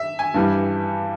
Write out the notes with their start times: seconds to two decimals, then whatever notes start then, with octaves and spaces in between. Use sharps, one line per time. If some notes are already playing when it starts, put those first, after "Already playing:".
Already playing: E5
0.19 G#5
0.34 G2 E3 G3